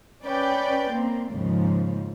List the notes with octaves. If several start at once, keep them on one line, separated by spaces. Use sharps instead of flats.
C#4 B4 D5 G5
A#3 C4
D#2 G#2 C#3 F3